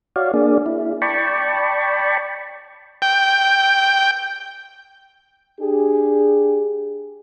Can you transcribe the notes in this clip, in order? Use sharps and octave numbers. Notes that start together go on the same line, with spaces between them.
F#4 C#5 D5 F5
A#3 D4 G#4 D5
E4
D5 G5 A5 B5 C#6
G5
D4 G4 G#4